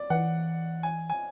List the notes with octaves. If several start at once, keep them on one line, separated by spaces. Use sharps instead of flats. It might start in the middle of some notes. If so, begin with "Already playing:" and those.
Already playing: D5
E3 F#5
G#5
G#5